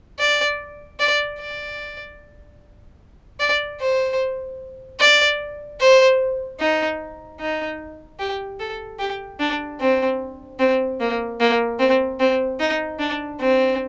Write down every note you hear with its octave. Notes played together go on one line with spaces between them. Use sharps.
D5
D5
D5
D5
C5
D5
C5
D#4
D#4
G4
A4
G4
D4
C4
C4
A#3
A#3
C4
C4
D#4
D4
C4